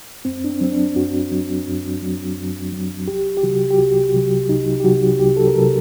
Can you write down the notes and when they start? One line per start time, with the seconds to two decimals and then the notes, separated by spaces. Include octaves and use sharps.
0.25 F#2 C4
0.44 D4
0.49 C4
0.61 F#3 C4
0.72 D4
0.96 F#2 F#4
1.31 F#3
1.67 F#2
2.02 F#3
2.37 F#2
2.72 F#3
3.08 C2 G4
3.37 G4
3.43 C3 F#3 F#4
3.70 G4
3.78 C2 F#4
4.14 C3 F#3
4.49 C2 D#4
4.80 G4
4.84 C3 F#3 F#4
5.19 C2 G4
5.37 A4
5.47 A#4
5.54 C3 F#3 A4